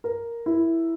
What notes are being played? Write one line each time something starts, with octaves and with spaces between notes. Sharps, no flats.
A#4
E4